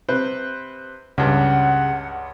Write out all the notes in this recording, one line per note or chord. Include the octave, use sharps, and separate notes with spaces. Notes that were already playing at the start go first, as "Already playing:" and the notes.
C3 B4 C5
C#2 G2 C#3 F#5